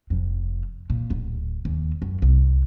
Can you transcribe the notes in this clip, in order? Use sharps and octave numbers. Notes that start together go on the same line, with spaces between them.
F1 F2
A#2
D1
D#2
F#2
C2